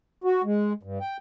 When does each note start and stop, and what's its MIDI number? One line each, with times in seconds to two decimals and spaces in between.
0.24 0.42 66
0.44 0.73 56
0.83 0.99 43
1.00 1.17 79